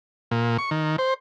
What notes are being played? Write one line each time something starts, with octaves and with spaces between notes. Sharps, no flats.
A#2
C#6
D#3
C5